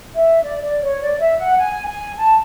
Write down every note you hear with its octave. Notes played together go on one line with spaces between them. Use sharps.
E5
D5
D5
C#5
D5
E5
F#5
G#5
G#5
A5